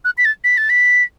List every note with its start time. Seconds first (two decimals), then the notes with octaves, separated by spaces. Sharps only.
0.05 F#6
0.18 B6
0.25 A6
0.44 B6
0.57 A6
0.70 B6